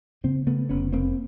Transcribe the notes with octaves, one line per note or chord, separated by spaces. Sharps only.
C#3 A#3 C4
C#3 A3 B3
F1 B3 C#4
F1 A#3 C4